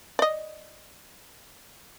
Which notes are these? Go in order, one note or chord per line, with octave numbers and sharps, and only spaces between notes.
D5 D#5